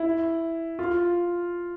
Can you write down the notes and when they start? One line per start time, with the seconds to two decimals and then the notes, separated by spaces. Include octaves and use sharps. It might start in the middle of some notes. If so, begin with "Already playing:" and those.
Already playing: E4
0.79 F4